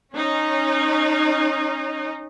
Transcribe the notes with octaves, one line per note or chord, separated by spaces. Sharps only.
C#4 D#4